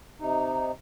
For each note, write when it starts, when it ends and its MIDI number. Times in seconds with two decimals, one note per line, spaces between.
0.21 0.71 48
0.21 0.71 63